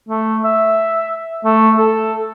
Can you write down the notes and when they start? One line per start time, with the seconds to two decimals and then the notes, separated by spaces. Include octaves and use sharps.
0.09 A3
0.44 E5
1.45 A3
1.77 A4